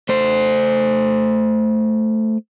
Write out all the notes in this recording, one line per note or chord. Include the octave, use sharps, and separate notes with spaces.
A3 C5